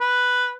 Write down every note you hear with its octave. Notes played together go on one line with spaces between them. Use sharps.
B4